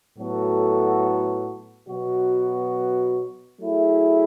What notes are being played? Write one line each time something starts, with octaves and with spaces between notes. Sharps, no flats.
A2 F#3 B3 F#4 A4
B2 F#3 B3 F#4
F#3 A3 E4 G#4